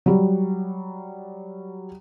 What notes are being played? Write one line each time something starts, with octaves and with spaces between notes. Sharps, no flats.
F#3 G3